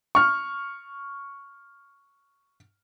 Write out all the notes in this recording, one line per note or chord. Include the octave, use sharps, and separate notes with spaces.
C#6 F6